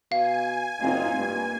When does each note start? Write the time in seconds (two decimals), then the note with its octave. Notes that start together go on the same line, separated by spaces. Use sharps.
0.12 B2 F5 G#5
0.81 F#1 C4 D#4 F4
1.17 G2 A#3